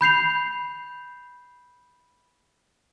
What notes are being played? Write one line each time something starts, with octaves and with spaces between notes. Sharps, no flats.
B5 G6 C7 F7